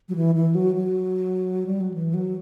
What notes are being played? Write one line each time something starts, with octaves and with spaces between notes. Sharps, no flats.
F#3
E3
E3
F#3
F#3
G3
F#3
E3
F#3